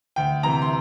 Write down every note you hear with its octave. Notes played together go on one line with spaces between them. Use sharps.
D2 G5
C3 E3 A#5
C6